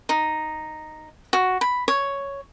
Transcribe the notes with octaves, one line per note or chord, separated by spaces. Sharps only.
D#4
F#4
B5
C#5